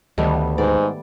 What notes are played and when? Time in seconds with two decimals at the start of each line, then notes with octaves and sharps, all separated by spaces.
0.18 D2 D#3 G3 A3 B3 D#5
0.58 G#2 B4 D5